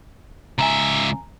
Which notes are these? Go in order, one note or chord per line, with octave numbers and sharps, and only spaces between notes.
C#2 E5 G#5 A#5